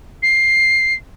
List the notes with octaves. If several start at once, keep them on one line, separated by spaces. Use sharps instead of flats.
C7